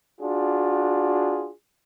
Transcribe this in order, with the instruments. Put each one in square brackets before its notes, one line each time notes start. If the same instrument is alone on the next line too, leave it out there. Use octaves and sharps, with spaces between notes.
[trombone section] D4 F4 F#4 G#4